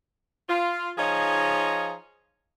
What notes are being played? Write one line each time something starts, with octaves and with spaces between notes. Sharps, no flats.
F4
F3 D#4 G#4 C#5 D#5 F5